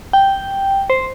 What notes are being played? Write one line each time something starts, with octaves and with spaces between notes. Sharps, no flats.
G5
C5